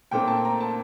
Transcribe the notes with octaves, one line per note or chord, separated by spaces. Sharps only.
A#2 A3 C4 G5
A5
A#5
A5